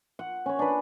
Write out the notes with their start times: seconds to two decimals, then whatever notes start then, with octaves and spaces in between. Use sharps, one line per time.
0.19 F#5
0.46 C#4 C#5
0.59 D4 B4